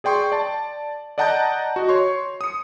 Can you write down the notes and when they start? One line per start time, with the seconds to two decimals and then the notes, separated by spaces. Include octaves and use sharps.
0.04 G#4 D5 G5 C6 C#6
0.32 D5 A5
1.18 D5 D#5 F#5 A5 A#5 G6
1.76 F#4 D#5
1.88 C#5 C6 C#6
2.41 D#6 C#7